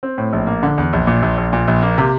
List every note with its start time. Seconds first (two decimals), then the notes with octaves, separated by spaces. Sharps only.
0.03 C4
0.18 A2
0.33 A#1
0.47 A#3
0.63 D3
0.78 E2
0.93 A#1
1.07 A#2
1.22 A#1
1.38 A#1
1.53 A#2
1.68 A#1
1.83 A#3
1.98 C3